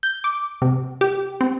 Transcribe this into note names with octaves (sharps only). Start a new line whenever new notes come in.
G6
D6
C3
G4
C4